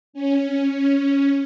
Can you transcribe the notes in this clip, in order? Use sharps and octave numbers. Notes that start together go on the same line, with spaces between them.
C#4